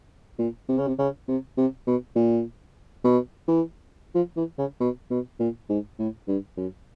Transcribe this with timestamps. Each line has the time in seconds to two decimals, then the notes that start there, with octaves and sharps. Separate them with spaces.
0.39 A#2
0.68 C3
0.78 C#3
0.87 C3
0.99 C#3
1.28 C3
1.57 C3
1.87 B2
2.16 A#2
3.04 B2
3.48 E3
4.15 F3
4.37 E3
4.58 C#3
4.80 B2
5.10 B2
5.39 A#2
5.69 G#2
5.99 A2
6.28 G2
6.57 F#2